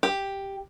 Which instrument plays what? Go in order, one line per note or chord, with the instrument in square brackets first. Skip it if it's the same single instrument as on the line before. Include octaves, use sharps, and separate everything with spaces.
[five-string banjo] G4